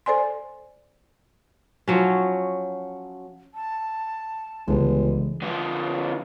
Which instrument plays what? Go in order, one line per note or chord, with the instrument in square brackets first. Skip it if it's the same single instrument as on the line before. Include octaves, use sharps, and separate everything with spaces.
[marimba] A4 C5 D5 G#5 C6
[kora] F3 F#3 C#4
[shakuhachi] A5
[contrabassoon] G1 [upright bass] C#2 C#3 [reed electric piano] E3 G#3
[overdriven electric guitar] D3 F3